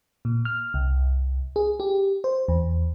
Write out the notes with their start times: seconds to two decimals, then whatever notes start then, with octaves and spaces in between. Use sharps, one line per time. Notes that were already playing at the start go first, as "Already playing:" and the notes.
0.25 A#2
0.45 F6
0.74 C2
1.56 G#4
1.80 G4
2.24 C5
2.48 E2